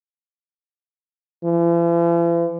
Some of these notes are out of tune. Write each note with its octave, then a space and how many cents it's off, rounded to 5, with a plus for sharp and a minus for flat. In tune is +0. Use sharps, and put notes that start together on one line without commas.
E3 +45